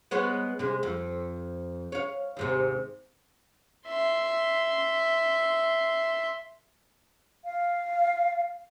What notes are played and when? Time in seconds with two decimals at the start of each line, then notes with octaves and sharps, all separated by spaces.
0.11 G#3 B3 C#5
0.59 C3 G#3
0.83 F2
1.92 C#5 F5
2.37 D#2 G#2 C3
3.87 E5 C6
7.45 F5